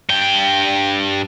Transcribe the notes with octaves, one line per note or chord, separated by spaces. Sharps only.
G2 G5